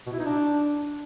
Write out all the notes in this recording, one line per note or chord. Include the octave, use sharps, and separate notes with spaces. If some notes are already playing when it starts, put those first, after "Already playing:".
B2
E4
D#4
D4